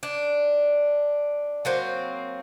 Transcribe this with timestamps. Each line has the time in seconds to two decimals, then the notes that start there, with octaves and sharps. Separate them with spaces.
0.03 D4
1.65 F#3 A#3 C4